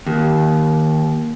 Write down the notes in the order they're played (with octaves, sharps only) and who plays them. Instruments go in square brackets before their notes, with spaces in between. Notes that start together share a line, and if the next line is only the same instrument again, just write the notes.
[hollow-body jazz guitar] D#2